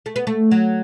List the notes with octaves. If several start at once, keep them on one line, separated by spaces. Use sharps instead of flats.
A3
B3
A3
F#3